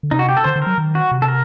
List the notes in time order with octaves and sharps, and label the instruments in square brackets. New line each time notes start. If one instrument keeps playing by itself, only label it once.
[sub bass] D3
[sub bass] C3 [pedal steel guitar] D#4
[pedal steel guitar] F#4
G4
A4
[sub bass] D3 [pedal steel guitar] C5
[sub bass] D3
[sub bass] F#3 [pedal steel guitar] A#4
[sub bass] D#3
[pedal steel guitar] F#4
[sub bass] C3
[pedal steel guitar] A4
A#4